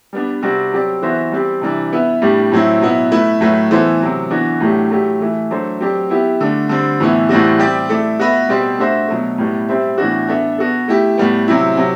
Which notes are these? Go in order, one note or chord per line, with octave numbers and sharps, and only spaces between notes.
G3 B3 D4
C3 G3 C4 F#4
F#3 C4 G4 D5
E3 B3 F#4 C5 E5
G3 C4 G4
C3 E3 G3 D4
B3 E4 B4 E5
A2 G3 D4 G4
A2 F#3 C4 E4
B2 F#3 B3 E4
A3 E4 B4
A2 F#3 A3 E4 B4
E3 B3 E4 A4 C5
C3 F#3 C4
E3 B3 D4 F#4
A2 F#3 A3 D4 G4
F#3 A3 E4 G4
E3 A3 E4
F#3 A3 D4 A4 C5
F#3 C4 G4 D5
B3 E4 G4
D3 A3 D4
D3 G3 C4
A2 E3 B3 E4
A2 E3 G3 C4 F#4
G3 C4 G4 D5
A3 E4 A4 D5
B3 F#4 B4 E5
B2 G3 C4 G4 C5
A3 D4 F#4 C5 E5
B2 F#3 A3
A2 G3 B3
G3 C4 G4 C5 E5
A2 E3 B3 D4 F#4
B3 D4 A4 E5
B3 F#4 A4
A3 E4 G4
A2 G3 B3
C3 F#3 C4 E4
C3 F#3